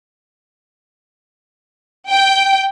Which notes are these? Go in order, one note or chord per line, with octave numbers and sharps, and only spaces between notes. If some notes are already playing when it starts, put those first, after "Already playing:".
G5